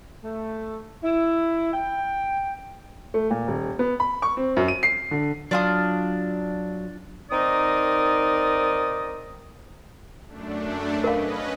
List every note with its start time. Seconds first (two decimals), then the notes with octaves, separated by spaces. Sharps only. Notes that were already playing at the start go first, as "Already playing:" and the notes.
0.24 A3
1.04 E4
1.73 G5
3.14 A3
3.31 A#2
3.48 D#1
3.79 B3
4.00 B5
4.22 C#6
4.37 C4
4.57 F#2
4.68 D#7
4.83 C7
5.11 D3
5.51 F#3 D4 F4 D#6
7.31 D#3 C4 D#4 A#4 D5 D#6
10.27 F#2 A3 D4
11.04 C#4 A#4 B4 D#5 F5